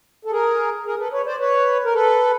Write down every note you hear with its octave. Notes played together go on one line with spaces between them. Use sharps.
A4
G#4 A#4
G#4 A#4
A4 B4
B4 C#5
C5 D5
B4 C#5
A#4
A4 B4